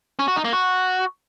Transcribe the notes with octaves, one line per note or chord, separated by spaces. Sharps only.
C#4
F#4
D#4
A#3
F#4